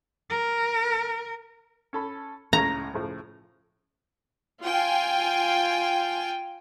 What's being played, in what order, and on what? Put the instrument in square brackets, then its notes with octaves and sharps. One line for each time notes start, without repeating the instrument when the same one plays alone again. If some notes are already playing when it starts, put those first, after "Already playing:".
[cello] A#4
[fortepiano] C#4 A4 B5
[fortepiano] C#2 A2 C#4 [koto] A#5
[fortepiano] A2 C#3 F3
[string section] F4 G5 G#5